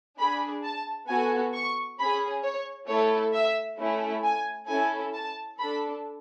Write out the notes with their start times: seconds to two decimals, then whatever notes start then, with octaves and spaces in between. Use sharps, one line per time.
0.19 D4 G#4 B5
0.64 A5
1.09 B3 F#4 A4 G#5
1.54 C#6
1.99 C#4 G#4 B5
2.44 C#5
2.88 A3 E4 A4 C#5
3.34 E5
3.79 A3 C#4 E4
4.24 G#5
4.68 C#4 E4 A4 G#5
5.14 A5
5.59 D4 A4 B5